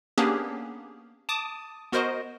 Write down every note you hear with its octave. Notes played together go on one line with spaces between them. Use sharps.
A#3 B3 C#4 D4 G4 G#4
A5 D6 D#6
B3 F#4 A#4 C5 D#5